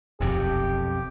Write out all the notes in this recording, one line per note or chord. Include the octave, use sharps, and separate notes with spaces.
D#1 B1 F2 C3 G4